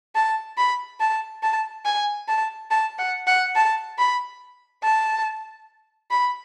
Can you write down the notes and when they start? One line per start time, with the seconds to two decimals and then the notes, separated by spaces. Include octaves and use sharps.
0.15 A5
0.58 B5
1.00 A5
1.43 A5
1.85 G#5
2.28 A5
2.71 A5
2.99 F#5
3.27 F#5
3.56 A5
3.98 B5
4.83 A5
6.11 B5